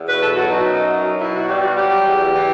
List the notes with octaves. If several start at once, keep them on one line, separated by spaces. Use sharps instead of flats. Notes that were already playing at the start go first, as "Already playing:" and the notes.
Already playing: E2
B2 B4
A4
F#3 F#4
D#4
F#2
F#3
B2 E4
F#4
G3 G4
F#4
F#3 G4
E2
E3